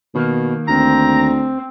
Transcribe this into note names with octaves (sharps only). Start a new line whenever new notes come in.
B2 D#3 A#3
D2 C4 A#5